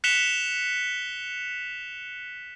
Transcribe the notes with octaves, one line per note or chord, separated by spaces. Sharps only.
F#6 B6 C#7 E7 F7 G7